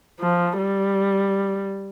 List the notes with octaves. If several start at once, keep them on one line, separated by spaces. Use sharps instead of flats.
F3
G3